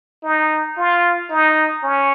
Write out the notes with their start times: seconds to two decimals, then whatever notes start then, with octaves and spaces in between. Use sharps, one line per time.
0.24 D#4
0.77 F4
1.30 D#4
1.83 C#4